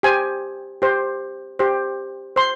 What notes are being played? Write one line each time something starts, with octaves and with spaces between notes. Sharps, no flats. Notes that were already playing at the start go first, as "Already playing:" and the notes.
G4 C5 G#5
G4 C5
G4 C5
C5 C6